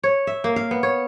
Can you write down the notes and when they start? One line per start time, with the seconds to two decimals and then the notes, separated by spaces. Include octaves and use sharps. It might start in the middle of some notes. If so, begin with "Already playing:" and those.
0.04 C#5
0.27 E5
0.44 A#3
0.56 F5
0.71 B3
0.83 C#5